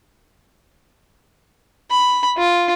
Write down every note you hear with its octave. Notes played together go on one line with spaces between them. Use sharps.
B5
F4